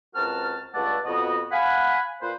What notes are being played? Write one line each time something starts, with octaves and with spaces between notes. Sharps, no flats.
C#2 C4 F#4 A#4 A5 F6
C#2 G2 A3 D5 F#5 A5
F2 B2 B3 F#4 D#5
F5 F#5 G#5 B5
A#2 B4 C5